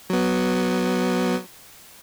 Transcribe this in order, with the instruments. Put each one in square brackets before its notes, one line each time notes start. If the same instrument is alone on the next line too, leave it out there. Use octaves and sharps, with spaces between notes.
[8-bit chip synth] F#3 B3